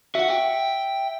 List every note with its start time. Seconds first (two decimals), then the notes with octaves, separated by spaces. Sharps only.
0.15 F#4 E5 F#5
0.30 G5